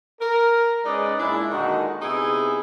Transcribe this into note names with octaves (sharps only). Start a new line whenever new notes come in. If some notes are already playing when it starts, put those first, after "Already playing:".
A#4
G#3 C#4 D#4 B4 D5
A#2 G#3 D4 E4
A#2 D3 D#3 G#3 D#4 F#4
C3 B3 D#4 E4 G#4